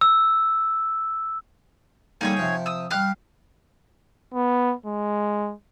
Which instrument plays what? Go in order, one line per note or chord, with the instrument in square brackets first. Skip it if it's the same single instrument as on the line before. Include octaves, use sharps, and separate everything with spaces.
[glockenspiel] E6
[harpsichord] D3 G3 A#3 [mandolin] D#4 G#4 C#5
[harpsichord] C3 F3 G5
[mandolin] D#6 E6
[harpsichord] G3 G4 [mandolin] F5 F6 F#6
[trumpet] B3
G#3